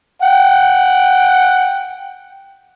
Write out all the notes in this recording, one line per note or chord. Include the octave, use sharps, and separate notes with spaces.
F#5 G5